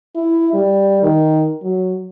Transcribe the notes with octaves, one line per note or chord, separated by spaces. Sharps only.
E4
G3
D#3
F#3